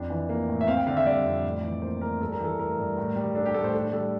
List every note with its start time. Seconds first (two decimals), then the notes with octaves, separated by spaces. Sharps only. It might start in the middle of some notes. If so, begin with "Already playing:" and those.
Already playing: F2 D4
0.10 E3
0.29 A#3
0.48 A2
0.61 E5
0.68 C4 F5
0.77 G5
0.87 D3 F5
0.97 E5
1.06 G3 D5
1.25 F2
1.44 A2
1.63 E3
1.82 A#3 C5
2.01 A2 A#4
2.21 G2 A4
2.32 A#4
2.40 E3 A4
2.59 A3 A#4
2.78 G2
2.97 A2
3.16 G3
3.35 D4 A4
3.46 G4
3.54 A2 A4
3.64 C5
3.74 D4 A4
3.93 G3 A4